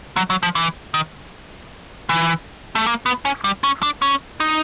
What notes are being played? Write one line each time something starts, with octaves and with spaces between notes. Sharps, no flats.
F#3
F#3
F3
E3
D#3
E3
A3
A#3
B3
C#4
G3
C#4
D4
C#4
D#4